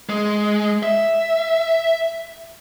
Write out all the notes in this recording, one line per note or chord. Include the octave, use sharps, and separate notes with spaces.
G#3
E5